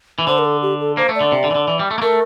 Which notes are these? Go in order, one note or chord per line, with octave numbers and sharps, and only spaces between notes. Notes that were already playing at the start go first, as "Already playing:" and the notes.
E3
D3 C5
A#4
A4
G4
A4
A#3 C5
A3
D5
D3
C3
D3
E3
D3
E3
G3
A3
A#3
A3 A#4